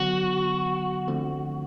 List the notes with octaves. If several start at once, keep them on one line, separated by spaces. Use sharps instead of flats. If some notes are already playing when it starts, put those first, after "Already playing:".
Already playing: D3 F#3 B3 F#4
D3 F3 A3 C4